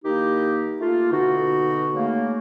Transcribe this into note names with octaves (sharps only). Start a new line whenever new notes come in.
D#3 A#3 D#4 E4 G4
A3 A#3 F4
B2 D3 D#4 F#4
C#3 A3 A#3